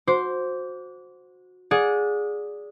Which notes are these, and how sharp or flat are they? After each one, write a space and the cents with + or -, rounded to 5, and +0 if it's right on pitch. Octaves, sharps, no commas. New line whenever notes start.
F#4 -20 C5 +0 D6 -25
G#4 +0 D5 -10 F#5 -35